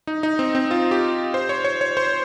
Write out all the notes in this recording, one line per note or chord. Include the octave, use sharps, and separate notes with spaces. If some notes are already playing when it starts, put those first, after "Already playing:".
D#4
D#4
C4
C4
F4
G4
C5
C#5
C#5
C#5
C5